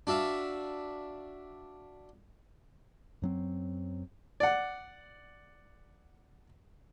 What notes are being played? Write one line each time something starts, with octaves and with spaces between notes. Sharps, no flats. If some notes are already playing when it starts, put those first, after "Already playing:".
D4 F#4 E5 F5
F#2 F#3 C4
D5 F#5